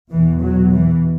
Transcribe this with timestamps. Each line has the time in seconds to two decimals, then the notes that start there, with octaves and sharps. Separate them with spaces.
0.11 E2 B2 E3
0.42 F#3
0.72 E3